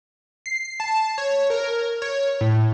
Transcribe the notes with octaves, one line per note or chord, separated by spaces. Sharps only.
C7
A5
C#5
A#4
C#5
A2